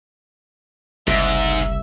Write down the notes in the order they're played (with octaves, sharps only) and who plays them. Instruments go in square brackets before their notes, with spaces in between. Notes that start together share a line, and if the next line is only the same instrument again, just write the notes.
[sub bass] F#1 [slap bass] C2 [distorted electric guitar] G#2 [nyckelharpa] E5